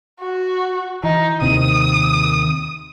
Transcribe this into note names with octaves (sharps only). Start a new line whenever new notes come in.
F#4
E3 D#4
D#2 C3 D#3 D#6